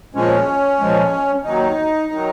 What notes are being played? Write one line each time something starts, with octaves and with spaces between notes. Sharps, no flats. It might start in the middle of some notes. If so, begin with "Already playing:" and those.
A#2 F3 G#3 C#4
A#2 F3 G#3
D#2 D#3 F#3 D#4
D#3 F#3